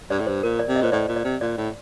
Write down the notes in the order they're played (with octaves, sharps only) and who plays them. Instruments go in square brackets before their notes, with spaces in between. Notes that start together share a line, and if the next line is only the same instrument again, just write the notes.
[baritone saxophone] G2 [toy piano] D5
[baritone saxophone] A2
[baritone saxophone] G2 [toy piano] C5
[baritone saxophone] A#2 [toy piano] A#4
[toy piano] D5
[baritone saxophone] C3
[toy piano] D#5
[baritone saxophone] A#2 [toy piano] C5
[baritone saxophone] A2 [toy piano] D5
[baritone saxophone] A#2
[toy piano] D5
[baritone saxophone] C3
[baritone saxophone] A#2 [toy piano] D5
[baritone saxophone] A2